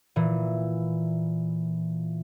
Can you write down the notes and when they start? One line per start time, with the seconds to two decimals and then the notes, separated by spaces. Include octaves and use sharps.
0.16 A#2 E3